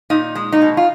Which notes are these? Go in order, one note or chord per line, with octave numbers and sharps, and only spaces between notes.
A#2 D#4
G#3
D#4
B2
F4